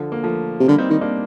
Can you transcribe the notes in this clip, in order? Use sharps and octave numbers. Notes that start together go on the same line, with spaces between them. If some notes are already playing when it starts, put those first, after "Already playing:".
Already playing: D3 F3
A#3
F3 A3
C3
D3 G3 A#3
C4 D#4
D#3 C4 D#4
A#3 D4